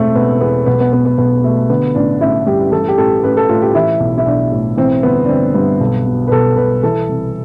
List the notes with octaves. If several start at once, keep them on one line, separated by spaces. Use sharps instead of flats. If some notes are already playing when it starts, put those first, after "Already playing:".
Already playing: E1 A1 A2 C3 A3 C4
E1 B3
E2 B3
B1 B3
B3
B2 B3
B3
B1 B3
B2 A3
D3 B3
A1 D4
A1 E4
G2 G4
E3 A4
G4
A1 A4
A1 B4
A4
A2 F4
G4
E3 E4
B1
E4
B1 D4
A2
E3 C4
G1 B3
D4
G1 C4
G2 B3
B1
B2
B4
B1 A4
B2 B4
E3 A4
C2